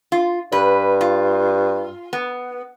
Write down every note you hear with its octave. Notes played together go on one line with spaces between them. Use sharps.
F4
G2 B4
F4
B3